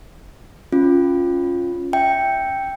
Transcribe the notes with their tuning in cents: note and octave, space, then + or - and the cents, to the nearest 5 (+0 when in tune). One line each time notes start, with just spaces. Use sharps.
C#4 +0 F4 +5
E5 +0 G5 +0